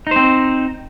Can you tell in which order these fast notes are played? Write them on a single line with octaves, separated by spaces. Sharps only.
D#4 C5 C4